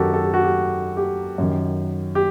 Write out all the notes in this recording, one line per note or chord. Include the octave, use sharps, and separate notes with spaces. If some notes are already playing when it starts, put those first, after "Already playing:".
Already playing: F#2 D#3 F#4 G4 A4 A#4
A4
G4
F#4
G4
G4
F#2 D#3
G4